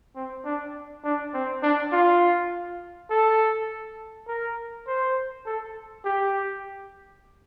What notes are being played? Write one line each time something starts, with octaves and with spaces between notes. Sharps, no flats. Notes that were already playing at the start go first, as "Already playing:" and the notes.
C4
D4
D4
C4
D4
F4
A4
A#4
C5
A4
G4